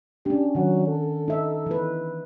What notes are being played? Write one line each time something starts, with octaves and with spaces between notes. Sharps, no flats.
C#4 D4 G4
D#3 F#3 F#5
A4
D#4 E5
E3 B4